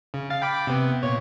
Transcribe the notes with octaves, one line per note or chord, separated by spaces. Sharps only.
C#3
F5 A6
G5 B5 D6
C3 B3
A#2 C#5